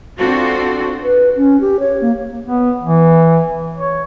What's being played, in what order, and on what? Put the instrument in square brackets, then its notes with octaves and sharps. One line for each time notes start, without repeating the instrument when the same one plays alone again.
[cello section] C4 D4 F4 F#4 A4
[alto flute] B4
C#4
G4
C#5
A#3
[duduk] B3
E3
C#5